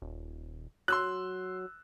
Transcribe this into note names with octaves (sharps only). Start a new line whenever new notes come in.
D#1
F#3 C6 E6 F#6